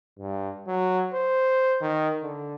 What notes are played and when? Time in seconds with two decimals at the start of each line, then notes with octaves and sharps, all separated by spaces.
0.19 G2
0.67 F#3
1.14 C5
1.81 D#3
2.23 D3